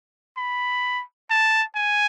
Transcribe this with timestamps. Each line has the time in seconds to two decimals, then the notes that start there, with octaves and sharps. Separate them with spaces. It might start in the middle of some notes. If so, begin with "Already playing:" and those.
0.37 B5
1.30 A5
1.76 G#5